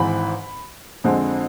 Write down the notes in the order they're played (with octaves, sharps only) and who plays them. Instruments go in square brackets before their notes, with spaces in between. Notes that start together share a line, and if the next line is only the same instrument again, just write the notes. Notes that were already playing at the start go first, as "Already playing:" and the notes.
Already playing: [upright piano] G#1 G#2 E3 B5
F2 D3 G#3 C4